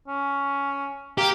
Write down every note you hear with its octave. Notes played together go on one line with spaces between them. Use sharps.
C#4
A#3 G4